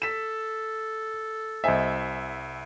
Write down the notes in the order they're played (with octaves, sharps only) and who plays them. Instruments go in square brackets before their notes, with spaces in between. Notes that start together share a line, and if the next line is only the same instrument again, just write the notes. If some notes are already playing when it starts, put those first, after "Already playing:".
[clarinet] A4 [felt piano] B6 E7
[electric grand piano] C2 E5 [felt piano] C5 D#5 G#5